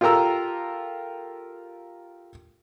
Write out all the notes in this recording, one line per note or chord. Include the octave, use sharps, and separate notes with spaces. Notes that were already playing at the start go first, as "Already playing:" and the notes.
F4 G4 A4 A#4 A#5 E6